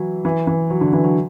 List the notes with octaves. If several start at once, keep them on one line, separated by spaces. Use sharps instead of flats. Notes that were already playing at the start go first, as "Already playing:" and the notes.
Already playing: E3 F#3
E3
E3
F#3
D3
E3
F#3